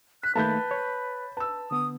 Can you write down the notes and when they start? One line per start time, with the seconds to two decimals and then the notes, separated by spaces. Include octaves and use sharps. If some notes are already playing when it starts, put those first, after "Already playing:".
0.23 F#6 B6
0.36 D#3 A3 A#3 B4 A5 B5 G6
0.71 C#5
1.37 B4 A5 E6
1.71 D3 B3 D#6